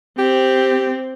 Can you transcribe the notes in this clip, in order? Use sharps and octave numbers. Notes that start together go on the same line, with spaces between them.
C4 G4